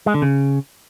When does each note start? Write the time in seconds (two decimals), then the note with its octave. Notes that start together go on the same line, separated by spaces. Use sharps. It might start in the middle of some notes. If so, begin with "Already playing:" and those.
0.06 G#3
0.14 D3
0.22 C#3